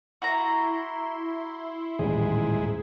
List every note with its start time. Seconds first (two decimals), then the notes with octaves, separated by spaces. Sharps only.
0.22 E4 F#4 A#5 C6
1.99 D#1 A1 G#2 G#4